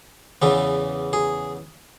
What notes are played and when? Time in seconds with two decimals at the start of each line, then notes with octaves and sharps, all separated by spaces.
0.42 E2 C#3 E3 B3
1.13 G#4